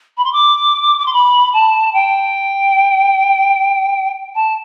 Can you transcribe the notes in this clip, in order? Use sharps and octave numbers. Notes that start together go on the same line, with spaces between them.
B5
C6
D6
D6
C6
B5
A5
G5
A5